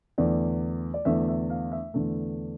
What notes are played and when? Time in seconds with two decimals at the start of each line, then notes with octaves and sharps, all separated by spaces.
0.18 E2 D3 A3 D5
0.94 D5
1.05 E2 D3 A3 E5
1.28 E5
1.50 F5
1.72 E5
1.94 E2 D3 A3